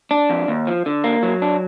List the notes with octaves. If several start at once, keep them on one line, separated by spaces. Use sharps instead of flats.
D4
F2
D#2
F3
D3
A#3
F#3
D4